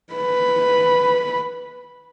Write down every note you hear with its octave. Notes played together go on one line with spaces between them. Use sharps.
B4 B5